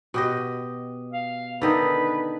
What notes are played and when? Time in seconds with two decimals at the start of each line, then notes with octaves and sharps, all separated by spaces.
0.14 B2 G4 D#5
1.13 F5
1.62 D3 D#3 D#4 B4